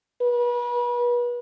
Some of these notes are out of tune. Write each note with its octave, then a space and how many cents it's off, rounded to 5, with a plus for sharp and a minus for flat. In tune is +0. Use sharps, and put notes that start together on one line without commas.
B4 -35